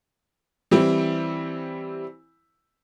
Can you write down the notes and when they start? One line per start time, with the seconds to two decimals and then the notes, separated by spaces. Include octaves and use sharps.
0.71 E3 G3 C4 E4